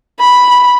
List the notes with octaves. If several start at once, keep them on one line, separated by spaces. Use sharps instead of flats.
B5